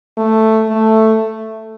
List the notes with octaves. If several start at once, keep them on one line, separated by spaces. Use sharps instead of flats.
A3
A3